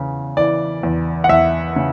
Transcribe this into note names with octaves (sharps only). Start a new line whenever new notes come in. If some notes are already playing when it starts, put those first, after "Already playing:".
Already playing: E2 C#3
E3 D5
E2
F#5
E2 E5
C#3